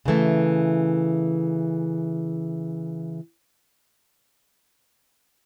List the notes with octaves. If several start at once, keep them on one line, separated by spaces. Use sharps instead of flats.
C#3 E3 A3